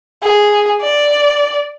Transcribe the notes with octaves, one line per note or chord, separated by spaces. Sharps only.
G#4
D5